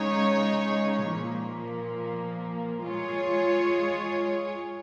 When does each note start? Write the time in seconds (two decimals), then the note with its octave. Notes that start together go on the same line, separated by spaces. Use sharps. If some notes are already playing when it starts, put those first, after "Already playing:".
Already playing: C#3 G#3 D#4 C#5
1.06 A#2 F3 A#3
2.82 G#3 F4 G#4 C#5